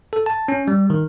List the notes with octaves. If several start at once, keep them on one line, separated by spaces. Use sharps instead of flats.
A4
A5
C#4
G3
D#3